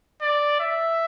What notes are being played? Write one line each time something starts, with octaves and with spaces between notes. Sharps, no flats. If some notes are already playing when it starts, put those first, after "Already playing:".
D5
E5